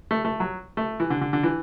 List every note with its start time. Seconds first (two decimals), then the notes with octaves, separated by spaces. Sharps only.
0.11 A3
0.25 A3
0.40 F#3
0.77 A3
1.00 E3
1.10 D3
1.21 D3
1.33 D3
1.43 E3